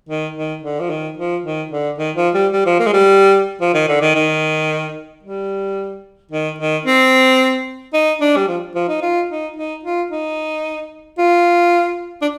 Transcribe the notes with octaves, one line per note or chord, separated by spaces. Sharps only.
D#3
D#3
D3
F3
D#3
F3
D#3
D3
D#3
F3
G3
G3
F3
A#3
G#3
G3
F3
D#3
D3
D#3
D#3
G3
D#3
D#3
C4
D#4
D4
G3
F3
F3
D#4
F4
D#4
D#4
F4
D#4
F4
D4